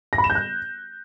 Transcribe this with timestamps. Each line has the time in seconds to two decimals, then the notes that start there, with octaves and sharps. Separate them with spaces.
0.13 A#6
0.18 B5
0.24 E7
0.30 G6
0.35 F#6